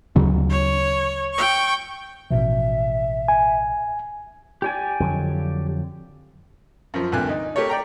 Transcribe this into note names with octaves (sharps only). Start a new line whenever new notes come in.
D2 C#3 F#3
C#5
G5 C#6
A1 B2 F3 E5
G#5
G4 D5 G#5
F2 D3 F#3
F#2 F3
D2 G2 C3 A#3 G#5 F#6
D#4
A3 G4 A#4 C#5
D5 G5 A#5